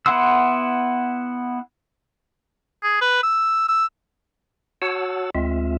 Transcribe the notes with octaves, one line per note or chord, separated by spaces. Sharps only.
B3 E4 F#5 C6 E6
G#4
B4
E6
E6
F#4 C#5 F#5 A5 E6
D2 G#3 C4 F4 E5